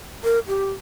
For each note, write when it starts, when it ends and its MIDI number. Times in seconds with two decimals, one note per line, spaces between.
0.24 0.39 70
0.48 0.71 67